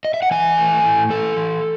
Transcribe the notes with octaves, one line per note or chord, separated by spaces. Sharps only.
D#5
E5
F#5
E3 G#5
A3
A2
E3 A4
E3